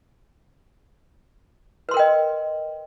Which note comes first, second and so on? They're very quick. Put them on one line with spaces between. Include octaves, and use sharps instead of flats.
B4 C6 A#4 G5 D#5